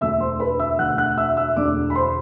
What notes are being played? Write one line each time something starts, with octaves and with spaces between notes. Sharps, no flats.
E1 D2 D3 E5 E6
C5 C6
B4 B5
E5 E6
E1 D2 D3 F#5 F#6
F#5 F#6
E5 E6
E5 E6
E1 D2 D3 D5 D6
B5
C5 C6